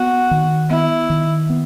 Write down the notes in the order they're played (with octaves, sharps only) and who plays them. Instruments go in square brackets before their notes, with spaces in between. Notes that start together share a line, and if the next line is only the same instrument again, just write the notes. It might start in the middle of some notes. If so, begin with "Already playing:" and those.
Already playing: [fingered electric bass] B3 [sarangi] F#4
[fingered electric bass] D#3
[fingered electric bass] B3 [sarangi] E4
[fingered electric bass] D#3
B3